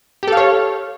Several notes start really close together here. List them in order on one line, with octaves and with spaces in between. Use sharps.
G4 A4 F5 C#5